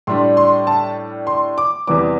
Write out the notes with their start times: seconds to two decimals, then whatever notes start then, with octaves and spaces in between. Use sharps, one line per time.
0.07 A2 G3 D4 C6
0.37 C6
0.67 A5
1.27 C6
1.58 D6
1.87 E2 C3 E3 G3 B3 D6